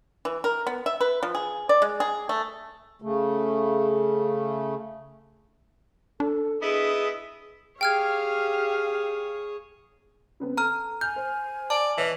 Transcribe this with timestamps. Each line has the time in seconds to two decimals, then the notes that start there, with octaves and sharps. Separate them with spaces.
0.25 E3
0.44 A#4
0.67 B3
0.86 E5
1.01 B4
1.23 F3
1.35 G#4
1.69 D5
1.82 G#3
2.00 G#4
2.29 A3
3.02 C#3 A3
6.20 D4 A4
6.62 B3 E4 G#4 D#5
7.81 G4 G#4 C#5 F5 G5 F6 G#6
10.40 C#3 B3 C4
10.57 A4 A#5 F6
11.01 G#5 F6 G6
11.16 C5
11.70 D5 A5
11.97 E3 C#5 D#5 F6